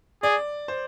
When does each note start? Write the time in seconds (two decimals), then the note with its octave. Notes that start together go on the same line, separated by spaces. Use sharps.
0.23 G#4 D5
0.68 C5